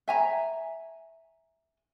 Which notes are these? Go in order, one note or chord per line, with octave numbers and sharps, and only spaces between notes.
E5 G#5 A#5